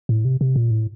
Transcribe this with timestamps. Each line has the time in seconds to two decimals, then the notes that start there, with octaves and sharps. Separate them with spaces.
0.09 A2
0.25 C3
0.41 C3
0.56 A#2
0.71 A2